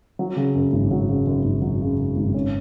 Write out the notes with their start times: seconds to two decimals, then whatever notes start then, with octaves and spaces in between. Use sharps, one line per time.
0.19 F#3
0.36 C#3
0.55 F#2
0.73 G#1
0.91 F#3
1.09 C#3
1.27 F#2
1.45 G#1
1.62 F#3
1.81 C#3
1.98 F#2
2.16 G#1
2.34 C#4